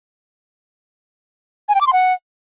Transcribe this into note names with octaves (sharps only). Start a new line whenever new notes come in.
G#5
G5
D6
C6
F#5